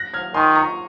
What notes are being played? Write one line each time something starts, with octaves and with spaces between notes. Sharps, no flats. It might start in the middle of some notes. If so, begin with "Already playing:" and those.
Already playing: F#6 A#6
F6 G#6
D#3 G#5 C6
A#5 C#6